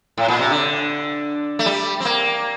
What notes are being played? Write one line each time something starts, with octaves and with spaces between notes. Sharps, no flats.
A2
A#2
C3
D3
A3
G3
C4
A#3